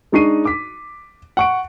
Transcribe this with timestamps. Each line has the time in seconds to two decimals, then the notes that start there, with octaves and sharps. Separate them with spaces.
0.12 G#3 D4 D#4 C#6 C7 D#7
0.45 D6 B6
1.37 F#5 C#6 D7